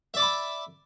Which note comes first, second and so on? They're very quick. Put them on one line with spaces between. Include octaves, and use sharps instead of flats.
E5 D5 D6 B5